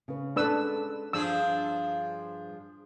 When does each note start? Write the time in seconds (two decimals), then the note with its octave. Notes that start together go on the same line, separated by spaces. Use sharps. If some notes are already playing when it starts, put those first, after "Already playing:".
0.08 C#3 C#4 B4
0.36 G#3 C#4 D4 A4 B4 E6
1.13 G2 F3 D4 G#4 E6